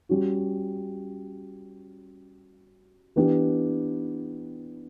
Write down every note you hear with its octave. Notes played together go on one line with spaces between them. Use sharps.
G3 C#4 F#4
E3 B3 D4 G4